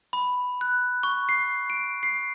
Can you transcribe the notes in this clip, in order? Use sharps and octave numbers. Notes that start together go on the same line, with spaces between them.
B5
F#6
C#6
C7
D7
C7